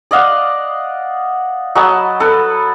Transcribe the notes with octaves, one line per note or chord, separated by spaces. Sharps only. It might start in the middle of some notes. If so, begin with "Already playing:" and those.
D5 D#5 F5 F#5
F#3 D#5 A5 B5
A4 B4